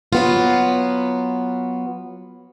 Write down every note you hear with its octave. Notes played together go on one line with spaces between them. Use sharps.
F#3 B3 F4